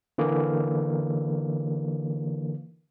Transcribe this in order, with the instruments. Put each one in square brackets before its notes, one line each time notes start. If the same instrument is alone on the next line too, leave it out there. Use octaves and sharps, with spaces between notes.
[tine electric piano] D3 E3 A#3